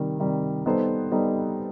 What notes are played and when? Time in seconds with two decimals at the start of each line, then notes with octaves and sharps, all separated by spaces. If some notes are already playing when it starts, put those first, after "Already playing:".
Already playing: C3 D#3 G3
0.19 C3 D#3 G3
0.66 G3 B3 D#4 A4 C5
1.12 G3 B3 D#4 A4 C5